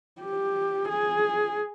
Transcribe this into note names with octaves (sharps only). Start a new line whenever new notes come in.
G4
G#4